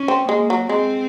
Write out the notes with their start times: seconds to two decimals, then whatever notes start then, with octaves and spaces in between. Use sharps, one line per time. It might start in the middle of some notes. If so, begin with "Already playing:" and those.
Already playing: C#4
0.08 C4
0.29 G#3 A#3
0.50 F#3
0.69 G#3 C4